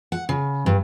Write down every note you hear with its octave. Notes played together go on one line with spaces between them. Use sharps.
F#5
C#3
G2